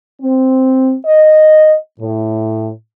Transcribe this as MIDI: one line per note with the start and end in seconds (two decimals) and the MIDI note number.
0.21 0.95 60
1.05 1.76 75
2.00 2.70 45